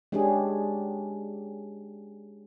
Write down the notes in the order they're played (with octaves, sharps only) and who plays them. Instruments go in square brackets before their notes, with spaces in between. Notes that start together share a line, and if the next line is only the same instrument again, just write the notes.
[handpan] G#3 C#4 D4 G4 G#4